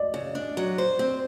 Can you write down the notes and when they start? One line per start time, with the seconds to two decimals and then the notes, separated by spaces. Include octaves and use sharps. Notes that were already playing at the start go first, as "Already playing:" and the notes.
Already playing: D5 D#5
0.14 C#3
0.35 D4
0.57 F#3
0.78 C5
0.99 C4